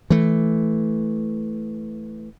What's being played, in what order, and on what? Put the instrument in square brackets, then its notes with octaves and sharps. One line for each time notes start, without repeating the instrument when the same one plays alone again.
[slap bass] E3 A3